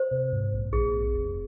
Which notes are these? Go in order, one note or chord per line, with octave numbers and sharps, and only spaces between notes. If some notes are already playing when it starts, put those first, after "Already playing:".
Already playing: C5
C3
G#2
A#1
A#1 G#4
C4
F1